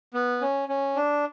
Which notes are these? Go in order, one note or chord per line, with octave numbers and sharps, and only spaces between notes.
B3
C#4
C#4
D4